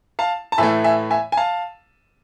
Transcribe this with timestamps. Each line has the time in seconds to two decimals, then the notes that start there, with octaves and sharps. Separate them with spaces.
0.19 F5 A5
0.52 A5
0.58 A2 E3 A3 E5 G#5
0.84 E5 G#5
1.11 E5 G#5
1.32 G#5
1.37 F5 A5